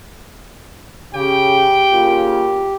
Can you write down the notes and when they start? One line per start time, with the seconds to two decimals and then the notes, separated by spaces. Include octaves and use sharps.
1.14 C#3 G4 G5
1.92 C#3 A#3 F4